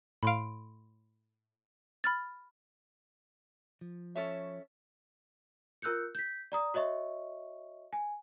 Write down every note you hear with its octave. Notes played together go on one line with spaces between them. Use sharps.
A2 F5 B5 C6 D7
B5 F6 A6
F3
C#4 A4 C#5 E5
F4 A#4 E6 F#6 G6 C#7
G6 B6
D5 A#5 D#6
F#4 C#5 D#5 E5 C#6
G#5